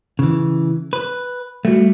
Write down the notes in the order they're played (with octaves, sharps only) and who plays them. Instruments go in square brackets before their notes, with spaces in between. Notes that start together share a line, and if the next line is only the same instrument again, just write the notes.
[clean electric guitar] C#3 E3
B4
[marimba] G3 F#4 [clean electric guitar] A3